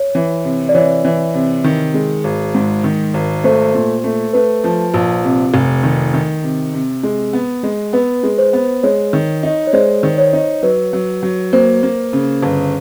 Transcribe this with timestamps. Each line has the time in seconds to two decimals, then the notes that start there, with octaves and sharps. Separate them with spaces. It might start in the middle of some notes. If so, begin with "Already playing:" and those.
Already playing: C#5
0.15 E3
0.45 C3
0.69 D5
0.74 E3 C#5
1.04 E3
1.34 C3
1.64 D#3
1.94 G#3
2.24 G#1
2.55 G#2
2.84 D#3
3.14 G#1
3.44 A3 C5
3.74 A#2
4.04 A3
4.33 A3 B4
4.64 F3
4.94 A#1
5.24 C3
5.54 F1
5.83 D#3
6.14 D#3
6.43 C3
6.74 C3
7.03 G#3
7.33 B3
7.63 G#3
7.93 B3 B4
8.23 G#3
8.38 C5
8.53 B3
8.83 G#3 C#5
9.13 D#3
9.43 D#4
9.67 C#5
9.73 G#3 C5 D5
10.03 D#3
10.18 C#5
10.33 D#4
10.63 F#3 B4
10.93 F#3
11.23 F#3
11.53 A#3 C5
11.83 A#3
12.13 C#3
12.43 G1